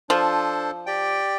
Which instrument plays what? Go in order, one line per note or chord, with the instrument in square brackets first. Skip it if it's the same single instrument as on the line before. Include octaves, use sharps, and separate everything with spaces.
[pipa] F3 [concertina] D4 A4 C5
[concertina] G4 D5 G5